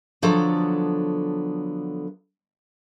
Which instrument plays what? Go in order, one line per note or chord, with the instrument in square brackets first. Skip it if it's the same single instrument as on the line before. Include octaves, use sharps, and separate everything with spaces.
[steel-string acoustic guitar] D3 F3 F#3 B3 A4